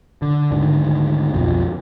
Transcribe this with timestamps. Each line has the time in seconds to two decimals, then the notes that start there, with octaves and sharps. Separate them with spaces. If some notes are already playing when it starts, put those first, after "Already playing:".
0.22 D3
0.51 D2 G#2 D3 D#3
1.33 B1 F2 B2 F3